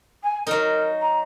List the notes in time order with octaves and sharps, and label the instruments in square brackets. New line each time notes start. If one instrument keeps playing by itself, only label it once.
[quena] G#5
[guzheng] F#3 D#4 [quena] A#4
[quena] A#5